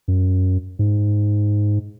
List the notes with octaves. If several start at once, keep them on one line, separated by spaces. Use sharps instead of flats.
F#2
G#2